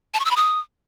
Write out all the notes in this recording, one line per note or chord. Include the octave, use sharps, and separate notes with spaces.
A5
C#6
E6
B5
D#6